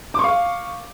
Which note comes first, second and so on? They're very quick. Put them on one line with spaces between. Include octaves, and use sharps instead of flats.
D6 C#6 F5